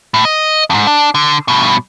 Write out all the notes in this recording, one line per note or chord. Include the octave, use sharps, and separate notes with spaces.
A2
D#5
F2 G#2
D4
D3
G2 B2